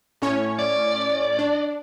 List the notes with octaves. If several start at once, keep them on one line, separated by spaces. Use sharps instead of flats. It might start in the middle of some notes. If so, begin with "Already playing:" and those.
A2 C#4 C#5
D5
D4